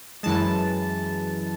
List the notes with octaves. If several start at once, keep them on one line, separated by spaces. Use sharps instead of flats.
F#2 E3 G#3 A5